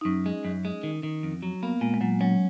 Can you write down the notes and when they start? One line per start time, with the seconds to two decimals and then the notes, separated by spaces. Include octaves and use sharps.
0.01 D#4
0.05 F#2 C#4
0.26 G#3
0.45 F#2
0.65 G#3
0.83 D#3
1.03 D#3
1.23 F2
1.42 F#3
1.63 A#3 B3
1.81 A#2 G#3
1.94 G#3
2.01 A#2 F#3
2.21 F#3 C#4